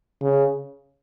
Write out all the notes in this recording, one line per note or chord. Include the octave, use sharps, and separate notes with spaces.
C#3